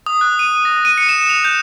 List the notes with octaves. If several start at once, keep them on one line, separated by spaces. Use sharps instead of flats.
D#6
F#6
D#7
A#6
D#7
C#7
E7
F7
G6